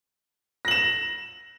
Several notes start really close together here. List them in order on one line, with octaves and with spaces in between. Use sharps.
A#6 F#7 E7